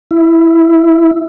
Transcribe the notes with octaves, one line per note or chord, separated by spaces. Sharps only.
E4